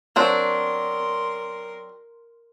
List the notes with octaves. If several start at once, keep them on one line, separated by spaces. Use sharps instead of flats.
F#3 C4 D4 A#4 C6